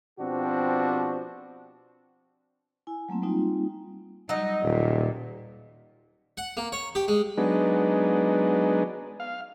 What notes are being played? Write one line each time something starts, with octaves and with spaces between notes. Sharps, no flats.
B2 F3 C4 D4 F#4 G4
E4 G#5
F#3 A3 A#3 C4
G3 A#3 C4 D#4 F4
F#3 G3 D#4 D#5
D#1 A#2
F#5
A#3
C#5
G4
G#3
F#3 G#3 B3 D4 D#4
F5